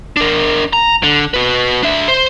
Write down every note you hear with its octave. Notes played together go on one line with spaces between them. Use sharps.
D4 A#4
A#5
D3
F#4 B4
D4 E5
C5